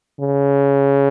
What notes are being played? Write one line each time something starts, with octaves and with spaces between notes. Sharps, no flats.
C#3